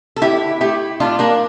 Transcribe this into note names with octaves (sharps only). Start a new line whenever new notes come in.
A4
D3 E4 G4
A3 E4 G4
A2 D4 F4
A#3 D4